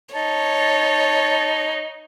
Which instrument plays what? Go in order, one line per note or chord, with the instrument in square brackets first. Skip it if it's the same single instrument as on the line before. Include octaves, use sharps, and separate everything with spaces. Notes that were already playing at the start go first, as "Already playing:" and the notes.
[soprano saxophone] D#4 [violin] C#5 [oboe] A5